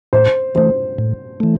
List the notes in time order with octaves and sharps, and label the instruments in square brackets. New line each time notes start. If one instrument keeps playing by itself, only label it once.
[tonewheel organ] A2 [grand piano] C5
[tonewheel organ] E3 A3 [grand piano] C5
[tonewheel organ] A2
E3 A3